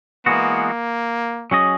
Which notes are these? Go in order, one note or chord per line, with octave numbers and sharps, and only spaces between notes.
E3 G#3 A#3 B3 F#4
F#3 C#4 G#4 D#5